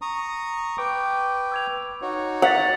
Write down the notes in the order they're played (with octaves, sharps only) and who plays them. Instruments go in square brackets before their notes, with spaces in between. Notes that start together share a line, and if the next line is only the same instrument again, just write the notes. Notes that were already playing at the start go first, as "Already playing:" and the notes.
[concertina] A#5 C#6 D#6
[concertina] B4 G5 [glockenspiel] C#6 D6 D7
[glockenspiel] E6 G#6 F7
[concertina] D#4 F#4 C#5
[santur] F#5 [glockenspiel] A6 B6 F7